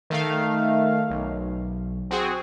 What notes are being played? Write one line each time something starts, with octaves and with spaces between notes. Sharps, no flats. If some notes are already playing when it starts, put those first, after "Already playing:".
D#3 A3 F5
B1
C4 F#4 G#4